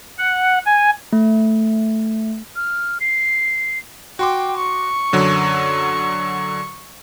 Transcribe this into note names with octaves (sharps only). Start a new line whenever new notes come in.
F#5
G#5
A3
F6
C7
F#4 G5 C6 D6
C#6
F#2 D3 F#3